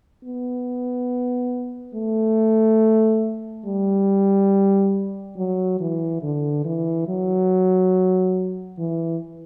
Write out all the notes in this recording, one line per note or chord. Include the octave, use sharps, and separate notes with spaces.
B3
A3
G3
F#3
E3
D3
E3
F#3
E3